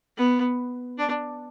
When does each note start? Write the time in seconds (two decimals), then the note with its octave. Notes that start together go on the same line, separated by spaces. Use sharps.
0.17 B3
0.98 D4